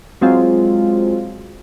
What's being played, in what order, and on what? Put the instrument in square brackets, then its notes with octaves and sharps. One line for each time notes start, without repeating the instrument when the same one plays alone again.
[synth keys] F#3 G#3 C4 F4